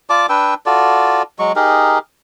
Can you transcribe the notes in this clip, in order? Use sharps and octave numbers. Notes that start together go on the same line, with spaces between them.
F4 D5 A5 D6
D4 B4 G5 E6
F4 F#4 A4 D5
F#3 G#3 C#6
D#4 G4 G#4 A#4